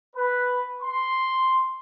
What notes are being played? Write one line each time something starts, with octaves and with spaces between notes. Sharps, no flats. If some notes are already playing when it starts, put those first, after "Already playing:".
B4
C6